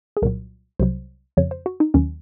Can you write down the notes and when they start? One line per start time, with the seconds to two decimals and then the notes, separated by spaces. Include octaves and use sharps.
0.17 G#4
0.22 C2 A#2 F#3 A#4
0.79 C2 C3 F#3 C5
1.37 F2 C#3 F3 C#5
1.51 C5
1.66 F#4
1.80 D#4
1.94 D#2 D#3 F#3 C#4